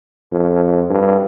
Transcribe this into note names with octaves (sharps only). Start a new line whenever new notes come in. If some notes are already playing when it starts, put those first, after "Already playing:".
F2
G2